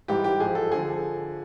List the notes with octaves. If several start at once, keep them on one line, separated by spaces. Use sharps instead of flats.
G#2 E3 G3 G4
G4
G#2 F3 G#4
A4
D3 F3 G#4